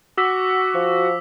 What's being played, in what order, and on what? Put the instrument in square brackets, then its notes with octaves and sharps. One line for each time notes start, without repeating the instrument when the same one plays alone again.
[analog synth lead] F#4 [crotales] D6 E6 B6
[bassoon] F3